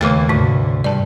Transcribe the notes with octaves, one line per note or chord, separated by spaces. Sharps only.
D#2 C#3 A3 A#3
D2 G#2 C3
G2 D5 A5